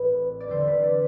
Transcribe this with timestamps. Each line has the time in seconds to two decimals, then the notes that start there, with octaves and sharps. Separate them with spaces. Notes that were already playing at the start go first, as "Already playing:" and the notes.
Already playing: A1 A2 G3 C4 B4
0.40 D5
0.48 E2 D3 G3 C5
0.67 B4
0.83 D5